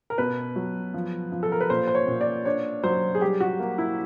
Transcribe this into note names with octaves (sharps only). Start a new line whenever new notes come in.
A#4
B2 B4
F#3
F3
F3
A4
A#4
B4
A#2 C5
C5
C#5
A#2
D5
D4 C#5
F#3 C5
G#4
G3 G4
F#4
A#3
E4